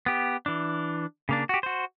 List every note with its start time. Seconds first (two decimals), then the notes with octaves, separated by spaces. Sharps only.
0.06 B3 G4
0.46 E3 D4
1.29 C#3 A#3 D4
1.49 F#4 G4
1.63 F#4 C5